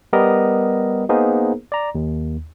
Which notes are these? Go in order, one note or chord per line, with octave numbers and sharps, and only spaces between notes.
G3 B3 G4 A#4 D#5
A#3 B3 D#4 G#4 A#4 C5
D5 A#5
D#2